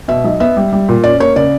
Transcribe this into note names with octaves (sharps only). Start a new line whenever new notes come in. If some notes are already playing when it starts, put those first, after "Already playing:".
B2 E5
B1
B3 E5
G3
G3
A#2
C#4 D5
A#3 C#5
C#3 D5